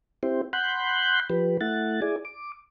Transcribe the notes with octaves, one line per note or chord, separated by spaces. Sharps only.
C4 E4 G4 C5
F#5 B5 C6 F#6 G6
F3 G4 B4
A3 E4 F#5 A6
E4 G#4 D5 G#5
D6